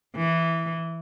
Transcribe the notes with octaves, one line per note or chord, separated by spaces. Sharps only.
E3